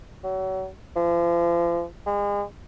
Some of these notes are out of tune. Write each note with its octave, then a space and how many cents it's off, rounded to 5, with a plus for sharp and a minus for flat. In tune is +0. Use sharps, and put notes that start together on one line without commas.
F#3 +35
F3 -35
G#3 -35